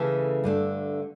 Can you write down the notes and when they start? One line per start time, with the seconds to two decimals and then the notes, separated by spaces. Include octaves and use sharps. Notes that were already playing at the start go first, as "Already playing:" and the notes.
Already playing: C#3 E3 A3 E4 A4
0.44 G2 D3 A3